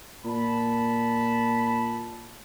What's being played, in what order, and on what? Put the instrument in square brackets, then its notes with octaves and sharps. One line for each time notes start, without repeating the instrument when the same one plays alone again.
[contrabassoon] A#2 [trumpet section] A5 B5